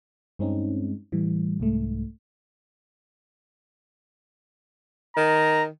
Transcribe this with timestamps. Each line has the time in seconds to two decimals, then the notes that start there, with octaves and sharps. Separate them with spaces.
0.39 G2 G#3 C4 C#4 D#4
1.12 A2 E3 G3
1.60 C2 G#2 A3
5.16 D#3 A#5